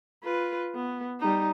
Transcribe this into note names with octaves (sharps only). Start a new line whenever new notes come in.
F4 B4
B3
G3 D#4